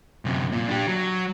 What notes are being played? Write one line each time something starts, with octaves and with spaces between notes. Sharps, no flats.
F#2 C3
A#2 F4
D4 G4
F#3